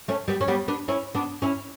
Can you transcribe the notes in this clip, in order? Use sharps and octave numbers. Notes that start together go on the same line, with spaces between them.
A3 C#4
G3 B3
C#4
G3 B3
B3 D4
C#4 E4
B3 D4
C#4 E4